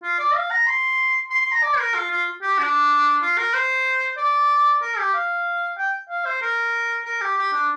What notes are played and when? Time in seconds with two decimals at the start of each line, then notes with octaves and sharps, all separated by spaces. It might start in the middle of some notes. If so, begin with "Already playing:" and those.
0.03 F4
0.19 D5
0.35 F5
0.51 A#5
0.67 C6
1.30 C6
1.41 C6
1.52 A#5
1.63 D5
1.79 A#4
1.95 F4
2.11 F4
2.42 G4
2.58 D4
3.22 F4
3.38 A#4
3.54 C5
4.17 D5
4.82 A#4
4.98 G4
5.14 F5
5.78 G5
6.10 F5
6.25 C5
6.42 A#4
7.05 A#4
7.21 G4
7.37 G4
7.53 D4